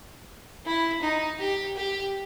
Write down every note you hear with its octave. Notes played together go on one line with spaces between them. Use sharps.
E4
D#4
G4
G4